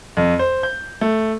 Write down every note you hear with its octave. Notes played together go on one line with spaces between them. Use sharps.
F2
C5
G6
A3